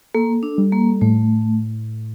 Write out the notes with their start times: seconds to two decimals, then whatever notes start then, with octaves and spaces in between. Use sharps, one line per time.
0.14 A#3 A4
0.43 D4
0.58 G3
0.72 A#3
1.01 A2 A3